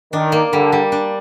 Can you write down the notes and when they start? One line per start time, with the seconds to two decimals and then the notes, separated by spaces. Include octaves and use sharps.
0.13 D#3 D4
0.32 A#3
0.52 D3 G3
0.72 G3
0.92 D4